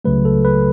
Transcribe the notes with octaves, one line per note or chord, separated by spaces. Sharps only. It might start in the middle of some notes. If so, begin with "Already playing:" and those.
C#2 C#3 F#3 A3 B4
A4
B4